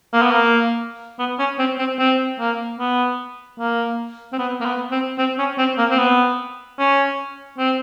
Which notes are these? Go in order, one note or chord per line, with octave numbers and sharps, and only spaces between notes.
A#3
B3
A#3
B3
C#4
C4
C4
C4
A#3
B3
A#3
C4
B3
A#3
B3
C4
C4
C#4
C4
A#3
C4
B3
C#4
C4